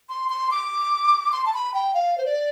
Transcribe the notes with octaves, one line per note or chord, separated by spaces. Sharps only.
C6
C6
D6
C6
A5
B5
G5
F5
C5
D5